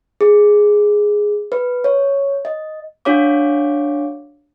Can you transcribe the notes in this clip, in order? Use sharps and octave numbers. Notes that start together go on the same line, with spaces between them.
G#4
B4
C#5
D#5
D4 F#4 C#5 F5 D6